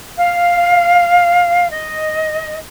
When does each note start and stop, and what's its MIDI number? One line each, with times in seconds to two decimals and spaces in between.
0.15 1.69 77
1.70 2.57 75